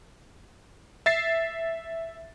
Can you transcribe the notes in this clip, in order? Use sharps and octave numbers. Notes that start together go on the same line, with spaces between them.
E5 A6 C7